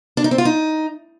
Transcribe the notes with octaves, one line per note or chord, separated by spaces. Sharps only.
D4
D#4
C4
F4
D#4